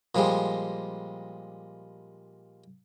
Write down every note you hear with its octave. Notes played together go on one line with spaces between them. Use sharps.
A#2 F3 G3 G#3